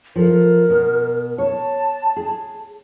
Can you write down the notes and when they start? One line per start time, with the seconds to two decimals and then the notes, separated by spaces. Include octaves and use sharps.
0.16 F3 A4 A#4
0.70 B2
1.38 C#5 A5
2.17 G#4